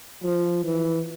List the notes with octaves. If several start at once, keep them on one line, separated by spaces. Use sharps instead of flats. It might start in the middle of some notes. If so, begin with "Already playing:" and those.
F3
E3